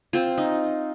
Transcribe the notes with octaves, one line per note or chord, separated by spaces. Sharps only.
C4 F4
D#4